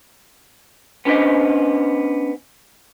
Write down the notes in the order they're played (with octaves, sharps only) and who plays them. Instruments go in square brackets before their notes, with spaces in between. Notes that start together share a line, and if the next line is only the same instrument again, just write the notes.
[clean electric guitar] B3 C#4 D4 C5 D#5